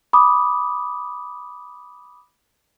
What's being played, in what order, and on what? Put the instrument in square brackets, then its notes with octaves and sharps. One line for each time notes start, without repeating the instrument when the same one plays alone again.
[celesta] B5 D6 D#6